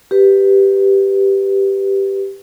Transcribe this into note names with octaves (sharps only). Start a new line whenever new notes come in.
G4 B4